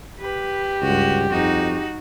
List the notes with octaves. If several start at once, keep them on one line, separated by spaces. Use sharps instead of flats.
G4 B4
C#2 G2 F#4
F2 D#4 F#4